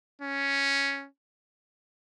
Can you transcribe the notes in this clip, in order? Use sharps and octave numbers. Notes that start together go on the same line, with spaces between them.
C#4